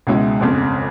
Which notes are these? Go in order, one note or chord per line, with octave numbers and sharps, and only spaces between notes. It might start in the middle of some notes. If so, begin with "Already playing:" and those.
C#2 B2 G#3 C#4 E4
G1 F2 C#3